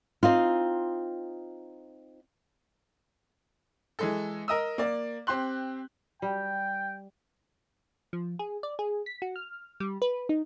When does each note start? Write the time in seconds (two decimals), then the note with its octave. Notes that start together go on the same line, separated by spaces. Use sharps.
0.23 C4 D#4 F4
3.99 E3 G#3 A4
4.48 A#4 D#5 D#6 E6
4.78 A#3 D5
5.27 C4 G4 C6 F#6
6.22 G3 G5
8.13 F3
8.39 G#4
8.63 D5
8.79 G#4
9.06 B6
9.22 F#4
9.36 F6
9.80 G3
10.02 B4
10.29 D#4